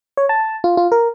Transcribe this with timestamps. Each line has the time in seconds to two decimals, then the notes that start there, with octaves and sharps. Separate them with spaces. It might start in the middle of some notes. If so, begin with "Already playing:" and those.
0.17 C#5
0.29 A5
0.64 F4
0.77 F4
0.92 A#4